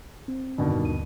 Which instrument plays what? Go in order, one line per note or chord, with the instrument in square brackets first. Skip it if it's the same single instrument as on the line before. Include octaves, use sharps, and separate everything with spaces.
[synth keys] C4
[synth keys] E2 D3 [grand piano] G2 B2 D#3
[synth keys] D#2 D#7